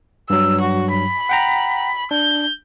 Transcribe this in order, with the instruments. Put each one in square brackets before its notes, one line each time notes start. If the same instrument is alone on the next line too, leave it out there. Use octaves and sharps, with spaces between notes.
[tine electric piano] G2 F#3 [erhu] E6
[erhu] F#4
B5
[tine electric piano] F#5 G5 A#5
[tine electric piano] D4 [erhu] G6